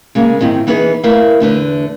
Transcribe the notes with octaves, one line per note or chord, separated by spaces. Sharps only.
C#3 G#3 A#3
G#2 D#3 C4 E4
E3 B3 D#4 G#4 B4
A3 E4 A#4 C5 E5 F5
E2 D3 A3 B4